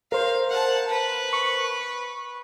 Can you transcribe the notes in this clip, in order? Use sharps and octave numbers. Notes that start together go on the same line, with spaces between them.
A#4 C5 F5
F#5 A5
B4
C#6